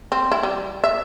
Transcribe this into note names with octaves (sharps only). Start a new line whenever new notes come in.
C4
E4
G3
E5